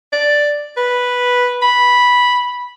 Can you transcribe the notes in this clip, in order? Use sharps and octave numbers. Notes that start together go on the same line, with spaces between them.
D5
B4
B5